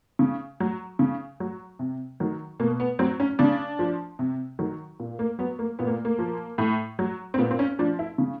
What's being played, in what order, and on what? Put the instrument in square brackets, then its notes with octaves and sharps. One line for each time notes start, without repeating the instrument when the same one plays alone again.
[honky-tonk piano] C#3
F#3
C#3
F#3
C3
D#3 F#3
B2 A#3
B3
F#3 C4
C#4
C#3 D4
F3
C3
D#3 F#3
A#2
A#3
F#3 B3
A#3
A#2 B3
A#3
A#3
F3
A2
F#3
C4
A#2 B3
C4
C#4
F3 D4
E4
C#3